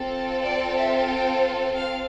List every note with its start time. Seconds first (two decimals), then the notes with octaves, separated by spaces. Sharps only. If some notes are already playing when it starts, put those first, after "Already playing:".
Already playing: C4 F4 A4
0.44 D5
0.77 E5
1.10 G5
1.75 F5